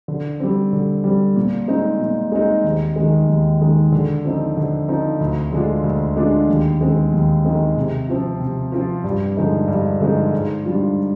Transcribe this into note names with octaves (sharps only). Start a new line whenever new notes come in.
D3
G3 C4
D3
G3 C4
A#2
G#3 C4 D#4
A#2
G#3 C4 D#4
D#2
D#3 G#3
D#2
D#3 G#3
D3
F3 C4 D#4
D3
F3 C4 D#4
D2
D3 G#3 D4 F4
D2
D3 G#3 D4 F4
D#2
D#3 G#3 C4
D#2
D#3 G#3 C4
C3
F3 C4 F4
C3
F3 C4 F4
G2
D3 F3 G#3 D#4
G2
D3 F3 G#3 D#4
G#2
G3 D4 F4